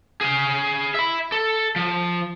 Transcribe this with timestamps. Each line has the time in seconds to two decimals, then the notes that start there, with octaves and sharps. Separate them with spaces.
0.21 G#4 F5
0.95 E5 B5
1.32 A4
1.76 F3